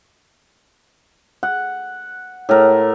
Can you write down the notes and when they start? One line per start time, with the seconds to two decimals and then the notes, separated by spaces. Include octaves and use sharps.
1.43 F#5
2.49 A2 A#4